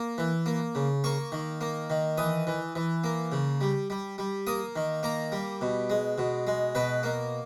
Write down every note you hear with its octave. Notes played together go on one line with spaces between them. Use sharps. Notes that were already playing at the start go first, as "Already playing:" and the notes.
Already playing: A#3
E3
A#3
C#3
A#3 C#6
D#3
A#3
D#3
E3 D#6
E3
E3
A#3
C#3
G3
G3
G3
A#3 D#6
D#3
A#3 A#5
G3
B2
G#3
B2
G#3
B2 B4
A#3